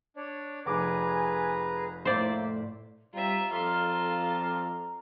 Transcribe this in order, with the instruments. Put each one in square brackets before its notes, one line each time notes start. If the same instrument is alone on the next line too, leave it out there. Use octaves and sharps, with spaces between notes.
[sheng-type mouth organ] D4 C#5 D5
[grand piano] F1 D6 [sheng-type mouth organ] G#4 B4 A#5 [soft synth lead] G#5
[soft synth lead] A2 [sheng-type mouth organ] A#3 E5 [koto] C5 D5
[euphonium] G3 [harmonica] C4 [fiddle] F4 E5 [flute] A#5
[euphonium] F2 [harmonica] F4 D5 F5 [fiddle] A4 C6